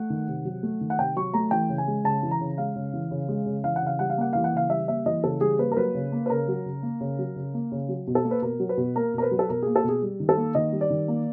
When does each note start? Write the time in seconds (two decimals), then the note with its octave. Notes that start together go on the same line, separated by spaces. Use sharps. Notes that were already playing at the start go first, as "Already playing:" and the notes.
Already playing: A3 F#5
0.10 D#3
0.28 C3
0.45 F#3
0.63 A3
0.81 D#3
0.90 F#5
0.98 C3 G5
1.16 F#3 C#6
1.34 A3 A#5
1.51 E3 G5
1.69 C#3
1.78 G#5
1.88 G#3
2.04 C#3 A5
2.23 E3
2.31 A#5
2.41 C#3
2.58 G#3 F5
2.76 C#3
2.93 E3
3.11 C#3
3.29 G#3
3.46 C#3
3.64 E3 F5
3.76 F#5
3.82 C#3 F5
3.99 G3 F#5
4.10 F5
4.18 A#3 F#5
4.33 E3 F5
4.44 F#5
4.53 C#3 F5
4.70 G3 E5
4.88 A#3 E5
5.06 E3 D#5
5.24 C#3 A4
5.41 G3 G#4
5.59 A#3 B4
5.72 A#4
5.77 F#3 B4
5.94 C#3
6.12 A#3
6.26 B4
6.30 C#3 A#4
6.48 F#3
6.65 C#3
6.83 A#3
7.01 C#3
7.19 F#3
7.36 C#3
7.54 A#3
7.72 C#3
7.89 F#3
8.07 B2
8.15 A4
8.25 A#3
8.31 B4
8.42 B2 A#4
8.60 F#3
8.69 B4
8.77 B2
8.96 A#3 A#4
9.14 B2 A#4
9.22 B4
9.31 F#3
9.39 A4
9.49 B2 A#4
9.62 A#3 G#4
9.76 A4
9.84 B2 G#4
10.02 G3
10.20 D#3
10.29 A4
10.37 A#3
10.55 D#3 D#5
10.73 G3
10.81 D5
10.90 D#3
11.08 A#3